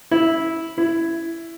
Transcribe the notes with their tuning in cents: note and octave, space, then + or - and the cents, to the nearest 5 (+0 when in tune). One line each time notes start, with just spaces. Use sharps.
E4 -10
E4 +10